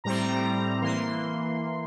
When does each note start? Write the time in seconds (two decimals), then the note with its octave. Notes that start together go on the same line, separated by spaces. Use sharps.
0.04 A2 G3 C4 A#5
0.81 E3 A#3 C6